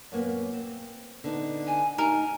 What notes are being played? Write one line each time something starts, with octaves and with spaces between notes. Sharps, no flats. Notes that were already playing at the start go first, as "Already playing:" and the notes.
F#2 A#3 B3
C4
D3 B3 D#4
G#5
D#4 A#4 G#5